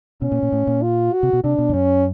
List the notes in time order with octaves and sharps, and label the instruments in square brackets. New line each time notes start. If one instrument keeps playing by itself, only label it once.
[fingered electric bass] B2 [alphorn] C#4
[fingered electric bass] A#2
A#2
A2
A#2
[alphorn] F4
F#4
[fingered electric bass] C3
B2
[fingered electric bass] C3 [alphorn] D4
[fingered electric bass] B2
F2
[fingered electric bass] F#2 [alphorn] C#4